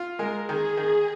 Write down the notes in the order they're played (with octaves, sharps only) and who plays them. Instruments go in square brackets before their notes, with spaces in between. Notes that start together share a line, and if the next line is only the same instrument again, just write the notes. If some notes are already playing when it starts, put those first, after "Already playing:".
Already playing: [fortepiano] F4
[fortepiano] G#3 [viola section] A#4
[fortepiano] D#3 [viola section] G#4
[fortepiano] D#3